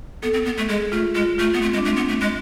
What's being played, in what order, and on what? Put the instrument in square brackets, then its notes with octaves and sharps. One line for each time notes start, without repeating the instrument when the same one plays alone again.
[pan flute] B3 [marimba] A4
[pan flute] C4
B3
A3
[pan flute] G#3 [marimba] G#4
[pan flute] A3 [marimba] F4
[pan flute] G#3 [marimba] F4
[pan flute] A3 [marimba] F4
[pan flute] B3
[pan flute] A3 [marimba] C4
[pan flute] G#3
[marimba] D4
[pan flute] A3
[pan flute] B3 [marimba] C4
[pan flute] A3
G#3